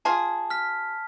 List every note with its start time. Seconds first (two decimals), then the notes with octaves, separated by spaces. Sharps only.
0.05 F4 G#4 A5
0.50 F6 B6